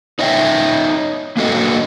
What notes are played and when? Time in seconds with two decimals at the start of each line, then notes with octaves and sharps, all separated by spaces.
0.19 D#4 C#5 D#5 E5 G5
1.37 A#3 D4 F#4 A4 D#5